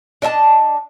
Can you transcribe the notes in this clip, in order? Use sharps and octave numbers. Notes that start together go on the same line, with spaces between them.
D4 D#5 E5 A5